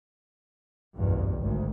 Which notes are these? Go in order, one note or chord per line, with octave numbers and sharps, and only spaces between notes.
F#1 B1 E2 G2
G#1 D2